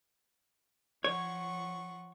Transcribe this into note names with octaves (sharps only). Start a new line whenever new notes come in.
F3 C#5 F#5 C#6